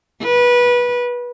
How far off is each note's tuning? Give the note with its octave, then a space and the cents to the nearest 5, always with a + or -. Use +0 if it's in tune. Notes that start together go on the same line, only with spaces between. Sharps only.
B4 -20